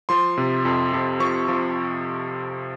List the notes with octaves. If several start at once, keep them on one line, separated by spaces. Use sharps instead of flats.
F3 C6
C3
F2
F2
F3 C#6
F3